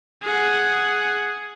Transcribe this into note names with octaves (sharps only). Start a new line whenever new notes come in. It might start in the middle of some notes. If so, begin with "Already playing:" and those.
G#4 F#5